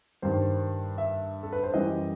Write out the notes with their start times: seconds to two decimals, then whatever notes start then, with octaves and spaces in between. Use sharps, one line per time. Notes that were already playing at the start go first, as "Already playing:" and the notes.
0.22 G2 D#3 G3 C5
0.98 E5
1.43 A4
1.52 B4
1.63 C5
1.74 F#2 E3 G3 D#5